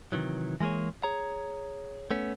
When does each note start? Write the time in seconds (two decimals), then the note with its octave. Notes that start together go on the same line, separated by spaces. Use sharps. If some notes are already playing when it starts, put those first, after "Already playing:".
0.12 C3 D#3 E3 F#3
0.60 E3 G#3 A#3 G#4 C#5
1.03 G#4 C#5 A#5
2.11 A3 B3 C#4